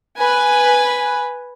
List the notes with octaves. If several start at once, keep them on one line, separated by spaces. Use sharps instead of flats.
B4 G#5